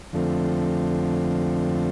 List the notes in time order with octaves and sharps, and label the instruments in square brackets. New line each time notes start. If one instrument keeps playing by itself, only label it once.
[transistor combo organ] F2 D3 F3 A3 C4